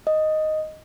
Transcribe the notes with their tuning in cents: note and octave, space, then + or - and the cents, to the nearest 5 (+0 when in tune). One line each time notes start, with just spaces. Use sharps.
D#5 +0